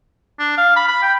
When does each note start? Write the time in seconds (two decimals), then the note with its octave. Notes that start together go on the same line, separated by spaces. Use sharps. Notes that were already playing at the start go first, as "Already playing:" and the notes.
0.40 D4
0.58 F5
0.76 B5
0.88 B5
1.03 G5